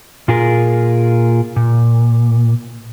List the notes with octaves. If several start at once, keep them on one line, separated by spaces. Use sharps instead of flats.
A#2 F4 G#4 A#4
A#2